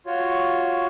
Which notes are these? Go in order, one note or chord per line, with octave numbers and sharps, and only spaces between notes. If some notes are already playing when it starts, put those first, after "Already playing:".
F4 F#4 C#5